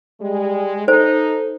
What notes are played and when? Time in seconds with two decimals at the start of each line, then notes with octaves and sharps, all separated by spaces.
0.21 G3 G#3
0.88 D#4 A4 C5